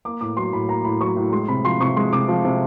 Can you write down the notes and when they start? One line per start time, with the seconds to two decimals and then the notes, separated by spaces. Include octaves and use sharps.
0.05 A#3 D6
0.21 A2 D6
0.37 F#3 C6
0.53 A2 B5
0.69 A#3 A#5
0.84 A2 B5
1.01 F#3 C#6
1.17 A2
1.32 G#3 C6
1.48 C3 B5
1.65 F3 C6
1.80 C3 C#6
1.96 G#3 C6
2.13 C3 D6
2.28 F3
2.44 C3